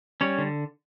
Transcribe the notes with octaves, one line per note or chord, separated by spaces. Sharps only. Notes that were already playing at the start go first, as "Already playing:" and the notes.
G3 C#4 C#5
D3